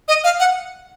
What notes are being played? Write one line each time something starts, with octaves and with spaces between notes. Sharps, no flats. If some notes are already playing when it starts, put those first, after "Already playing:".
D#5
F5
F#5